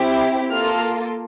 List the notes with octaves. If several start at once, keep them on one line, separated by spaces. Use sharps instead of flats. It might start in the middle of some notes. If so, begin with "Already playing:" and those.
Already playing: C4 E4 G4
A#3 F4 A4 F6